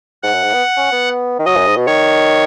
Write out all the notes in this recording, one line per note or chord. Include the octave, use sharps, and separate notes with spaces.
G#2 F#5
F#2
G#2
B3
C#4
B3
D#3
F#3 D#5
F#2
G#2
B2
D#3 C#5